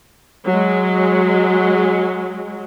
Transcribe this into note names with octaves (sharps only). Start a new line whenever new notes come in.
F#3 G#3